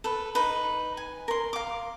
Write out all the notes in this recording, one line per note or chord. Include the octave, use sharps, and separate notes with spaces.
A4 B4
D#4 B4
G#5
A#4 C6
F5 D6